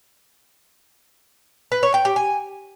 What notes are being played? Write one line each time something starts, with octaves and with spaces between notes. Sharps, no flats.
B4
C#5
G5
G4
G#5